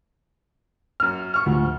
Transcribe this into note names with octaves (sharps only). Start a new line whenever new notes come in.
F#2 F6
C#6 F6
D2 F3